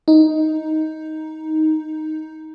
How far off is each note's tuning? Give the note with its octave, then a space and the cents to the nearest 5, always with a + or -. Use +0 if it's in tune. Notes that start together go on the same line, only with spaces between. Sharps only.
D#4 +10